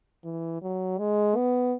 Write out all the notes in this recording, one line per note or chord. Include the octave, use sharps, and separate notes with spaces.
E3
F#3
G#3
B3